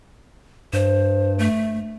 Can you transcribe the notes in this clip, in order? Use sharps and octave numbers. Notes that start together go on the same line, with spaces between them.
G2 C5
A3